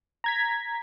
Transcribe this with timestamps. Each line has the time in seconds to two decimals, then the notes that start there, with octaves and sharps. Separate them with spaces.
0.24 A#5 G#6 B6